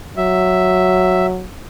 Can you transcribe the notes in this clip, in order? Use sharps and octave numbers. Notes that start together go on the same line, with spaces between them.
F#3 E5